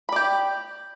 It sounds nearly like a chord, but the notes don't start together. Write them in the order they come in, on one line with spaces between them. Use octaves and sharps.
B5 D5 G4